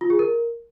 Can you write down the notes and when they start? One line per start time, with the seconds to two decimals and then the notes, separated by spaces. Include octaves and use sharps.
0.01 F4
0.10 G#4
0.19 A#4